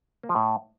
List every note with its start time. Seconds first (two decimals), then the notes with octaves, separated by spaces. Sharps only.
0.23 A#3
0.29 F3
0.35 A2